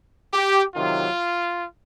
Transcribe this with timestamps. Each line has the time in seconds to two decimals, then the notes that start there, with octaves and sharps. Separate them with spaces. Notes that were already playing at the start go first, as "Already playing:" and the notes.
0.34 G4
0.76 C3 D#3 F#3 F4